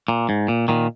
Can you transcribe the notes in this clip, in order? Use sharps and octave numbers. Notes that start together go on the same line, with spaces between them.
A#2
G#2
A#2
A#2 D#3